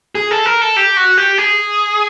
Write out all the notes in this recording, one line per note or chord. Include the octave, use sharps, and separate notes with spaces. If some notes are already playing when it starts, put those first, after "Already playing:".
G#4
A4
A#4
A4
G4
F#4
G4
G#4